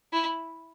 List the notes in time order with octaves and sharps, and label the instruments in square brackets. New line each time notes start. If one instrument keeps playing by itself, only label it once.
[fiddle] E4